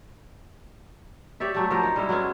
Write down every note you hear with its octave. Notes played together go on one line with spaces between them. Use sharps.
G4 C#5 D5 E5
F#3 A3 G4
F3 G4 A#4 C5
D#4
G3 G#3 A#3 E4
F#3 G#3 B3 C#4